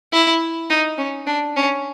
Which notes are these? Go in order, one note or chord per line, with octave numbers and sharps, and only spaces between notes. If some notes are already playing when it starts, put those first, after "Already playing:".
E4
D#4
C#4
D4
C#4